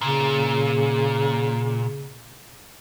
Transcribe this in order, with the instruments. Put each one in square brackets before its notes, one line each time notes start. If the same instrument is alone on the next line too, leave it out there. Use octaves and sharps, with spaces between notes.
[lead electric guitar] A#2 [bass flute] C#3